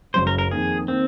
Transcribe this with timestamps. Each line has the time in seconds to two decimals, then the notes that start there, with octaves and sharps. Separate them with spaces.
0.14 F#1 F#2 C#3 F#3 C5
0.27 A#4
0.38 A#4
0.51 F2 D#3 A#3 G#4
0.88 D#3 A#3 C4